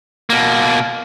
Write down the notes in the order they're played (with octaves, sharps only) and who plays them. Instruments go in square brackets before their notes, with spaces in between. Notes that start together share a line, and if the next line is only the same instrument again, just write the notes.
[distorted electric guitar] B2 A#3